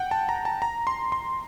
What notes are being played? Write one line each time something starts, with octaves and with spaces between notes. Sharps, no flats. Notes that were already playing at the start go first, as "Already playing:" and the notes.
Already playing: F#5 G5
A5
A#5
A5
A#5
C6
C6